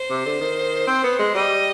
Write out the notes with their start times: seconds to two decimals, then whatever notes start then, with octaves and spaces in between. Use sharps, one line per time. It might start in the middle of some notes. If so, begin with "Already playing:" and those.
Already playing: C5
0.10 C3
0.26 D3
0.40 D#3
0.87 C4
1.03 B3
1.19 G#3
1.34 G3 D#5